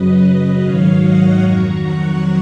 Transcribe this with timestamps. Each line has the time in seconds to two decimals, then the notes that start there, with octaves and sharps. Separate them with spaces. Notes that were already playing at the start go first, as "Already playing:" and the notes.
Already playing: F#2 C#3 F#3 B4 D#5
0.23 B4 D#5
0.62 G#2 D#3 F#3 C#5 F5
1.02 D#5 F#5
1.41 F2 D#3 F#3 A#5 C#6
1.80 F#5 A#5